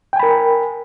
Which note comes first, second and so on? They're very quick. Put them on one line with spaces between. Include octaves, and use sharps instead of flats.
G5 G#5 B5 A#4